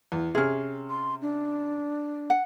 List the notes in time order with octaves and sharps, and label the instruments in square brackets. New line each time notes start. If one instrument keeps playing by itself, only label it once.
[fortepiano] E2
[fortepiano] C3 F6 [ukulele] C#4 G#4
[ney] C6
D4
[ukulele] F#5